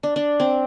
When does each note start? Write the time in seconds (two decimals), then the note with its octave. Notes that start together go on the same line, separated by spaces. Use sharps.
0.03 D4
0.16 D4
0.40 C4